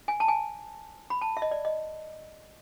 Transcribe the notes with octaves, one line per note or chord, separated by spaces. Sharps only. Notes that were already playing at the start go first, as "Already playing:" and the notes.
G#5
A5
G#5
B5
A5
E5
D#5
D5
D#5